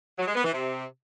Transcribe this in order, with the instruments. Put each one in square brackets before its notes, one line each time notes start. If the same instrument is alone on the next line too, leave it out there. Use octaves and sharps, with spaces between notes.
[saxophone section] F#3
G#3
B3
E3
C3